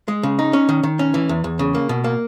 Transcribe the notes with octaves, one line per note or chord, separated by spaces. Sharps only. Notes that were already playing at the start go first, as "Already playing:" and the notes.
G#3
C#3
D#4
C#4
D#3
D#3
C#4
E3
E2
E2
C#3
A#3
B2
A#3